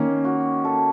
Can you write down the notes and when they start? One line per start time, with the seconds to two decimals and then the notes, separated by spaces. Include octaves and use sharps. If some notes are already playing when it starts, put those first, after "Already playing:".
Already playing: D#3 A#3 C#4
0.25 F#4
0.65 A4